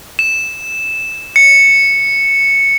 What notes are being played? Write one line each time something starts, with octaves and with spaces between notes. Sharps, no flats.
E7
C#7